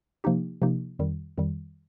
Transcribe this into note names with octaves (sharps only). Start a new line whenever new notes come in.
C3 F3 A#3 D#4 G4
C3 F3 A#3 D#4 G4
F2 D#3 G3
F2 D#3 G3